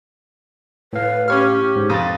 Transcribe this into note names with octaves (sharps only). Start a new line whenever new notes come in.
A2 B4 F5
C#4 G4 C#5 F6
G#2
F2 D#6 A6